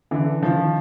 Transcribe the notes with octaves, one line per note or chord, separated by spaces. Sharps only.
D3 E3
D#3 F3